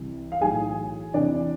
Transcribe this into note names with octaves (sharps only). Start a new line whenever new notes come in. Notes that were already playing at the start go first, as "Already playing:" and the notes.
Already playing: C2 C3 E3
F5
B1 A2 E3 G#4 G#5
E2 C3 E3 D4 D5